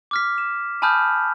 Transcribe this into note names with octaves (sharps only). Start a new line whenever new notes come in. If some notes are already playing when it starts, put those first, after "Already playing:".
D6 F6 B6
E7
G#5 A5 B5 D#6 F6 G6